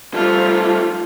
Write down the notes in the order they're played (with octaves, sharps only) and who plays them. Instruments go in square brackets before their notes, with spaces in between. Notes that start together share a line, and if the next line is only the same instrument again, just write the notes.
[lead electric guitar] F3 A3 [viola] G3 F4